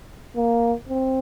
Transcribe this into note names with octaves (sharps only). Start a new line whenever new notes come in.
A#3
C4